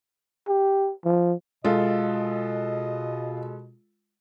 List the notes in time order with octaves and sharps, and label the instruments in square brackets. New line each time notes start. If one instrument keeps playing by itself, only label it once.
[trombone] G4
F3
[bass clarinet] B2 [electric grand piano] G#3 A4 [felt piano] F4 [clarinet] D#5